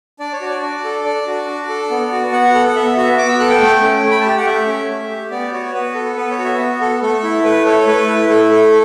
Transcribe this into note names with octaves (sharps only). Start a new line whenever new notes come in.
D4 D5
C#5
F#4 D5
D4 D5
A4
D4 D5
F#4
D4
A4
B3
F#4
B3 F#5
A4
F#5
B3 E5
F#4 E5
B3 D6
E6
A4 F#6
G5
A3
C#4
A3
B5
A5
G4 G5
F#5
A3 E5
C#4
A3
G4
B3 D5
F#4 C#5
B3 B4
A4
B3 B4
C#5
F#4
E5
B3
A4
A3 A4
E4
A3 B4
A4 C#5
A3 B4
E4
A3 A4
A4